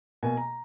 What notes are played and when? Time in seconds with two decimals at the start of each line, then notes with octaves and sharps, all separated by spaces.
0.23 B2 A#3 G#5
0.37 A#5